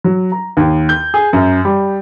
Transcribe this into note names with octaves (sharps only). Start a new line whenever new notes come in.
F#3
A#5
D#2
G6
G#4
F#2
G3